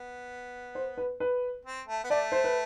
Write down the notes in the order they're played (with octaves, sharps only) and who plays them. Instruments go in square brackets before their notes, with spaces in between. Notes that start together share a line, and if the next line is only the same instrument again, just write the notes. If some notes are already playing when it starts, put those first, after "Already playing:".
Already playing: [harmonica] B3
[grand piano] C5
B4
B4
[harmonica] C4
A3
B3
[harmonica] A3 [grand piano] D5
[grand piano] C5
B4